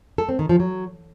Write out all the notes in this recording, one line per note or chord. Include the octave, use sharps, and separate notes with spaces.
A4
C4
D#3
F3
F#3